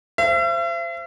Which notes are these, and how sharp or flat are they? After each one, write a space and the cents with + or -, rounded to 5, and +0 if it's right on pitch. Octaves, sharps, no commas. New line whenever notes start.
C5 +0 E5 +45